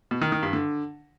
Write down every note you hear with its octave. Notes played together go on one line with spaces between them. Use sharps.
B2
D#3
D#3
G2
D3